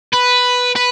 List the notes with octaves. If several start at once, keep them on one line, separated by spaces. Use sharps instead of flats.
B4
B4